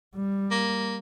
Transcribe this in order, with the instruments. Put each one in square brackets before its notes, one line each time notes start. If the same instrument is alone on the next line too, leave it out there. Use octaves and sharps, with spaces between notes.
[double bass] G3
[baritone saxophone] A#3